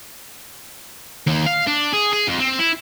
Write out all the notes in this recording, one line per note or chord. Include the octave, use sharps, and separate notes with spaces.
D#2
F5
D4
G#4
G#4
F2
C4
E4